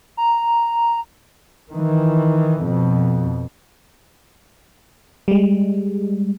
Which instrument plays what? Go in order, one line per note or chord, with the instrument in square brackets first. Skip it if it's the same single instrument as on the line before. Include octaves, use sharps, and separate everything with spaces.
[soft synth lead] A#5
[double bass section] D#3 E3
F2 B2
[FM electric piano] G3 G#3